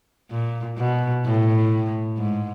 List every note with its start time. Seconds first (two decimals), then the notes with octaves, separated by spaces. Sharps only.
0.31 A#2
0.78 B2
1.25 A2
2.18 G#2